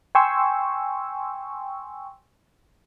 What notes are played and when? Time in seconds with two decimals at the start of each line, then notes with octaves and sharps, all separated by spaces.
0.15 G5 G#5 C6 C#6 E6